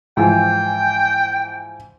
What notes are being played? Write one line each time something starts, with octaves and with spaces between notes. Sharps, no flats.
G#2 E3 F3 G5